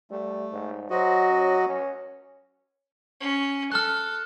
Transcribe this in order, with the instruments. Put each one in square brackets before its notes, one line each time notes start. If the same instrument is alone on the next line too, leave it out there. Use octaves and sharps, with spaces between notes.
[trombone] G3 [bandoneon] A3
[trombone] G#2
[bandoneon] F#3 F#4 D#5 [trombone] C5
[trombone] C#4
C#4
[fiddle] C#4
[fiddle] A4 [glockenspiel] F6 F#6